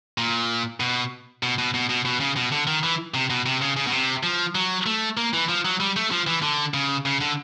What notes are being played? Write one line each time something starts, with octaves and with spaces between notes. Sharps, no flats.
A#2
B2
B2
B2
B2
B2
B2
C#3
B2
D3
D#3
E3
C3
B2
C3
C#3
C#3
B2
C3
F3
F#3
A3
A#3
E3
F3
F#3
G3
A3
F3
E3
D3
C#3
C#3
D3